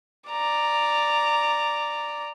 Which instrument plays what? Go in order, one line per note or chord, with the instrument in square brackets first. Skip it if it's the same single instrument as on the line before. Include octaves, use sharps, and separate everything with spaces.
[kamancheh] D5 A#5